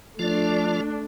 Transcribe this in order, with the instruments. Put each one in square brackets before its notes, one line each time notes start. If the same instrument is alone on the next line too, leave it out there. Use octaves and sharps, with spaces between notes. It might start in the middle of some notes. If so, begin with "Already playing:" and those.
[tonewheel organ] F3 F4 D5 [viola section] A3 D4